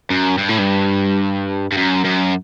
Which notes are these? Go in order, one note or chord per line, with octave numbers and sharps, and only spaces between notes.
F#2
G2
A2
G2
G2
F#2
F#2